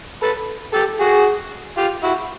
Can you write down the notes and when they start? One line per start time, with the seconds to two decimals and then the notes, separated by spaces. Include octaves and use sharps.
0.22 A4 B4
0.73 G4 A4
1.00 F#4 G#4
1.77 F4 G4
2.03 E4 F#4